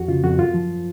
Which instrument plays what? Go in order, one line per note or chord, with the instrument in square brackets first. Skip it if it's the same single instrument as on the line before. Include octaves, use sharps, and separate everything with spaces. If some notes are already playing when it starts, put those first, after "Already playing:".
Already playing: [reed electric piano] F2 F#4
C#3 F4
F2 F#4
F#2 F4
F3